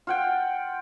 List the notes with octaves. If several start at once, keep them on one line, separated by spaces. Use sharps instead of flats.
F4 F#5 G5